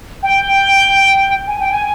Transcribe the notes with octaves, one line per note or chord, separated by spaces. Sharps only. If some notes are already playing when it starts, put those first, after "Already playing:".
G5
G#5
G5
G#5